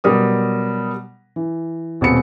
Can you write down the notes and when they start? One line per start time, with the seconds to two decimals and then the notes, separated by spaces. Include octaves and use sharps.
0.04 B2 F#3 G3 A#4 D#6
1.36 E3
2.01 D#1 B2 C4 B5 C#7